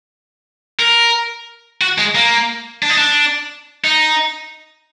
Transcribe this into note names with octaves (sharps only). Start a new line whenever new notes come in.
A#4
F#4
G#3
A#3
D4
D#4
D4
D#4